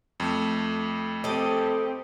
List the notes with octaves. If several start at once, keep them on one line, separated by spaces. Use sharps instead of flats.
F2 A3
C4 G4 A4 D#5